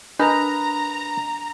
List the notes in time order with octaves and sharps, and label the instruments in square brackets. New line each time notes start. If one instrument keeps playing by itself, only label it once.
[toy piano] D4 [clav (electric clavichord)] A#4 B4 D#5 [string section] A#5